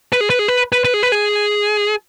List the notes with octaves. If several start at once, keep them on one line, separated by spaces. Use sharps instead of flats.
B4
G#4
B4
G#4
B4
B4
B4
G#4
B4
G#4